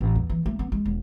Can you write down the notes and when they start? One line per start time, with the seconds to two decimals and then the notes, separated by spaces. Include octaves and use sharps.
0.01 A1
0.15 E2
0.29 E3
0.46 A3
0.59 B3
0.72 G#3
0.85 E1